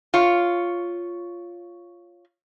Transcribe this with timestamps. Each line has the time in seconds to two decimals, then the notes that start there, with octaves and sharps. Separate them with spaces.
0.14 F4 C#5